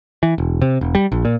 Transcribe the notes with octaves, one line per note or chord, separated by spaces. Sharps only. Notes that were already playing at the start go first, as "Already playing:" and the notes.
E3
E1
C3
E1
G3
A#1
A#2